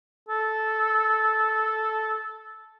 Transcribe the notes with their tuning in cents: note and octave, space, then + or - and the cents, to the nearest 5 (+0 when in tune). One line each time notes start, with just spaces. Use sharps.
A4 -10